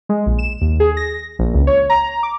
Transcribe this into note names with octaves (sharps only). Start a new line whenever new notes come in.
G#3
A#1
E7
D#2
G#4
A#6
A#1
C#2
C#5
A#5
D6